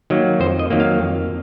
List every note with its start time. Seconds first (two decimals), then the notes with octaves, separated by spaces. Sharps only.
0.10 D#3 F#3 A#3
0.40 F2 C5
0.59 D#5
0.70 D#3 F#3 A#3
0.80 F5
0.99 F2